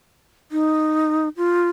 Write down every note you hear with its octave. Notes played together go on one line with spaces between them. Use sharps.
D#4
F4